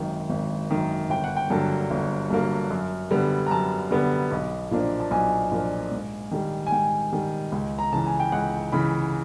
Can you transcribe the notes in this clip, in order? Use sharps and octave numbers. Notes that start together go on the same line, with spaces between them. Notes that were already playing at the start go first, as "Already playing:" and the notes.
Already playing: G#1 F#2 D#3
G#1
F#2 D#3
G1 G5
F#5
G5
G2 D3 F#3 A#3 A5
G1
G2 D3 F#3 A#3
F#2
D3 G3 B3
A#5
F#2 A5
D3 G3 B3
B1
A#2 F3 A#3 D4
A5
B1 G#5
A#2 F3 A#3 D4
G#2
D#3 G3
G#5
G#2 G5
D#3 G3
C#2
A#5
C#3 E3 A5
G#5
G5
C#2 F#5
C#3 E3 B5